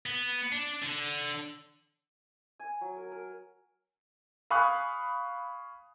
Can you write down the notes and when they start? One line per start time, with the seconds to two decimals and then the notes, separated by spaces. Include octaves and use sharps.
0.06 B3
0.52 D4
0.82 D3
2.59 G#5
2.81 F#3
2.96 A#4
3.12 A#4
4.50 F5 G#5 B5 C#6 D#6 F#6